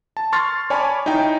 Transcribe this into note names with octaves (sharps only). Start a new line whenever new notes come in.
A5
C6 C#6 F6 A6
C#5 D5 G#5 A5 B5 C#6
D#4 E4 C#5 G5